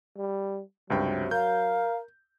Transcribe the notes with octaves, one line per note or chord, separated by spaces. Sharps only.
G3
C#2 G2 C3 F#3 G5
A#4 F5 G6